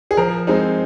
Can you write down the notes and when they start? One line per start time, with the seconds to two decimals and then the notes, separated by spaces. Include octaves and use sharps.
0.11 G#4
0.17 F3 A#4
0.47 G#3 C4 D#4